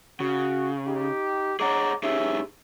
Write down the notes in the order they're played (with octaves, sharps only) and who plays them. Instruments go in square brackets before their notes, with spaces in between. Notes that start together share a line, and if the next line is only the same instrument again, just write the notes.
[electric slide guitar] C#3 [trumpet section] F#4
[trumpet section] D#4 G4
[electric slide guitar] G#4 D#5 F#5 [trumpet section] C#5 A#5 D6
[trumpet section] C#4 E5 [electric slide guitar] D#4 G4 G#4